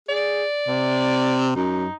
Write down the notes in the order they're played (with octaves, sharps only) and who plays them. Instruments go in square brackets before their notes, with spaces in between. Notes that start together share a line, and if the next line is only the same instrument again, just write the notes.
[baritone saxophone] G#4 [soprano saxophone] D5
[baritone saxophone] C3
[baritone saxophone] F#2 [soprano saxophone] D#4